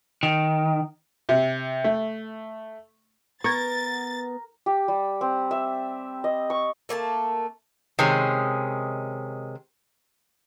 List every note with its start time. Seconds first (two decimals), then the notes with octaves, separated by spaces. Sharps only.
0.23 D#3
1.29 C3
1.84 A3
3.44 B3 A#4 C#6 G#6 A6
4.66 G4
4.88 G3
5.21 C4
5.51 E5
6.24 D#5
6.50 C#6
6.89 A3 A#3 G#5 A5
7.99 C3 D#3 G#3 C#4